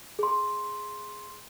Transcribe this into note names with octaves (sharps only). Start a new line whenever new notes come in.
G#4 C6